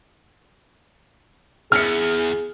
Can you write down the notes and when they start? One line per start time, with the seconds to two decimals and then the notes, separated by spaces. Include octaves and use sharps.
1.72 E2 G#4 F6 C#7